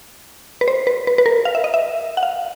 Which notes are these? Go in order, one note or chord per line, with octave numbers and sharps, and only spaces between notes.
B4
C5
B4
B4
B4
A#4
F5
E5
D#5
E5
F#5
F5